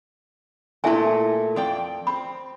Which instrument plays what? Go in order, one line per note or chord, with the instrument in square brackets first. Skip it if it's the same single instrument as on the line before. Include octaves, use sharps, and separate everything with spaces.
[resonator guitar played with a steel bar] A#2 A3 [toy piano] E4 E5 G#5
[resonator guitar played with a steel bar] F2 D5 G5
[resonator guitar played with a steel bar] C4 [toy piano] B5